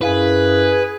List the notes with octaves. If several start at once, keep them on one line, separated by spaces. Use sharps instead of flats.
F#2 E4 G#4 B4 F5 G#5